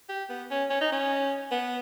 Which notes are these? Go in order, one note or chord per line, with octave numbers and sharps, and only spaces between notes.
G4
B3
C#4
C#4
D#4
C#4
B3